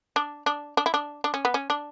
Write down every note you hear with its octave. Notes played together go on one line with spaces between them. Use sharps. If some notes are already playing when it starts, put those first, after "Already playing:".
D4
D4
D4
E4
D4
D4
C#4
B3
C#4
D4